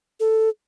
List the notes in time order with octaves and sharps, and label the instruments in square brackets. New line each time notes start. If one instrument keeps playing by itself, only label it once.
[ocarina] A4